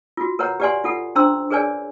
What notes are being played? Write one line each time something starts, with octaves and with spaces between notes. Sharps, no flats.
F4 F#4
A#4 B4 C#5 F#5 A#5
G4 B4 D5 F#5 G#5 C6
F4 A4 F#5
C#4 D4 C5 A#5 C6 E6
G#4 A#4 B4 C#5 D5 G#5